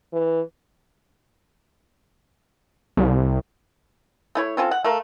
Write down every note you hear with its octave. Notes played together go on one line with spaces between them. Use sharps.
E3
C2
A3 E4 C#5
C4 C#4 F4 A4
F#5
A3 A#4 F5